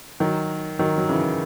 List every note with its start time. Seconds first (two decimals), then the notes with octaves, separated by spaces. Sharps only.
0.20 D#3 F#3
0.79 D#3 F#3
0.98 F#3
1.09 C#3 E3